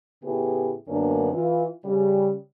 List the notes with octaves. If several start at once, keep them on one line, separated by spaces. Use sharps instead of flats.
A2 C#3 B3 E4 G4 G#4
F#2 D3 A#3 B3 C#4 D4
E3 F4
C#3 G3